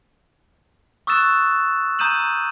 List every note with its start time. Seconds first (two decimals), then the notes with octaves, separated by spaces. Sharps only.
1.07 C#6 D#6 E6 F#6 A6 E7
1.99 A#5 D#6 G6 D#7 E7 F#7